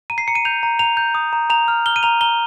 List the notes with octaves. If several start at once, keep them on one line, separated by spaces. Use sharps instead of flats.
A#5 D#7
C7
A#5 C#7
D#7
G6 F7
A#5
A#5 F7
G6
D#6
A#5
A#5 F7
F6
F6 G7
D#7
A#5 F7
A#5 G7